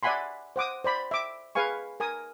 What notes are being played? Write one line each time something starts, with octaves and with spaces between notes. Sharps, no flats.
D5 E5 F#5 G#5 B5 C6
C5 F#5 D6 D#6
C5 D5 B5
E5 D6
G#4 B4 F5 G#5 C#6
A#4 G#5 D#6